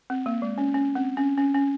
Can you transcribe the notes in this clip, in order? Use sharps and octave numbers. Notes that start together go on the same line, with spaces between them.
C4
A#3
G#3
C#4
C#4
C4
C#4
C#4
C#4